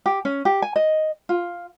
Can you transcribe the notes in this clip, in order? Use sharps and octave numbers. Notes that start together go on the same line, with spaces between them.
G4
C#4
G4
G#5
D#5
F4